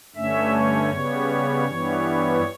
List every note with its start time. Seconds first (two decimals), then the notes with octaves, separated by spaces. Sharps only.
0.15 G2 D3 A3 C#4 E5
0.52 C#5
0.91 C#3 G3 B3
1.67 G2 E3 G3 B3